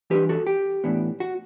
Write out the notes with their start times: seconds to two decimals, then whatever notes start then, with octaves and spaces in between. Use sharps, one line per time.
0.10 E3 G3 D4 G4 B4
0.29 F#4 A4
0.47 G4
0.84 A2 E3 B3 D4
1.20 F#4